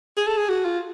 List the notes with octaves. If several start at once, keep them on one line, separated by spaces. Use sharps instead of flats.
G#4
A4
G#4
F#4
F4